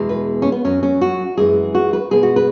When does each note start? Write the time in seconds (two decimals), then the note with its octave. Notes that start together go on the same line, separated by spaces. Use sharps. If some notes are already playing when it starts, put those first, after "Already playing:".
Already playing: E2 B2 G#3
0.09 B4
0.42 C#4
0.52 B3
0.64 F#2 F#3 C#4
0.83 C#4
1.01 F#4
1.37 F#2 E3 G#3 G#4
1.75 F#4
1.93 B4
2.11 B2 G#3 G#4
2.23 F#4
2.36 B4